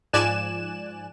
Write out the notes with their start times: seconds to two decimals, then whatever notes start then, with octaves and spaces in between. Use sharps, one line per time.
0.13 G#2 F3 D5 G#5 F#6 E7